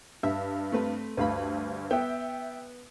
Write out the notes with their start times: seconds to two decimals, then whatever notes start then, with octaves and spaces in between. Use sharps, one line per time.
0.23 G2 E5
0.72 A3 C4 B4
1.17 D2 G2 B4 F5 B5
1.91 B3 E5 G5